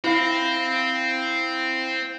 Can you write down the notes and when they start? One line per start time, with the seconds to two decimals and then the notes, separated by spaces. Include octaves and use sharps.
0.04 C4 E4 F5 A#6